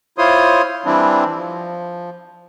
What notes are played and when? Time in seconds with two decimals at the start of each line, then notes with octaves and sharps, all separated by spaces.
0.18 E4 F4 C5 C#5 C6 D#6
0.85 E3 G3 C4 D4 E4
1.36 F3